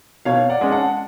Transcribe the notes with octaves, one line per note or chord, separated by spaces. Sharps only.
B2 C#5 F5
D5 F#5
G#3 C#4
F#5 A5